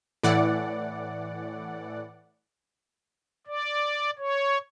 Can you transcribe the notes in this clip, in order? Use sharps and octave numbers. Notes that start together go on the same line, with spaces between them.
A2 E3 D5 F#5
D5
C#5